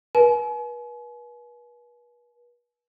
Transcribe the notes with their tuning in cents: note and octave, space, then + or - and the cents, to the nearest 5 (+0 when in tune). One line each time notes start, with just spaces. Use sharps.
B4 -40 G#5 +40